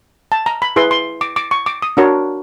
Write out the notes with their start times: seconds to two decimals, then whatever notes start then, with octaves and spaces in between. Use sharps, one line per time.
0.32 A5
0.46 A#5
0.62 B5
0.76 E4 G#4 B4 C6
0.91 C6
1.21 D6
1.36 D6
1.51 C#6
1.66 D6
1.82 D#6
1.97 D4 F#4 A#4 C#5